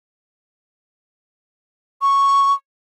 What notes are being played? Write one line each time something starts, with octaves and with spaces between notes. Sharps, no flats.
C#6